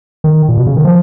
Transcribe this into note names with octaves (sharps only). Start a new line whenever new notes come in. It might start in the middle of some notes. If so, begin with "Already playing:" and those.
D#3
A#2
B2
C#3
D#3
F3